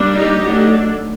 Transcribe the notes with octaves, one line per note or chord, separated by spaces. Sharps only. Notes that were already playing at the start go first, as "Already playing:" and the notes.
Already playing: G3 A#3 D4
D#4 G4
F#3 A3 D4